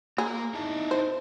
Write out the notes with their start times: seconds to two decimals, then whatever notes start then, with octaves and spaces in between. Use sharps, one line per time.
0.18 A#3 G#4 A#5
0.55 D#4 E4 A5
0.91 C5